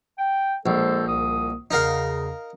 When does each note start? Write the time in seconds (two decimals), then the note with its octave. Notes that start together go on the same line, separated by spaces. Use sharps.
0.19 G5
0.66 A#1 G#3 A4 C5
1.08 C2 D#6
1.71 E2 C#3 D#4 A#4 F5